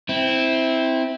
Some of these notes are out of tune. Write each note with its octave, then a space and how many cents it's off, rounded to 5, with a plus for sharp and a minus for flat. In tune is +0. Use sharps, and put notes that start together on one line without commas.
C4 +0 E4 -15